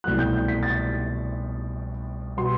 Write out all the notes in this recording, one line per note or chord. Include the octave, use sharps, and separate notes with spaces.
C2 B2 F#3 A3 F#6
G6
G6
B6
A6
B2 G3 B3 C6